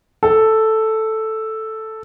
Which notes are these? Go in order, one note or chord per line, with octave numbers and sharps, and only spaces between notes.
A4